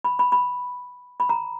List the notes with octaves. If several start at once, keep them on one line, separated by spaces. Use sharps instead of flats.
B5
B5
B5
B5
A#5